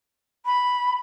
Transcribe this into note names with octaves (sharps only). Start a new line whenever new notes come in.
B5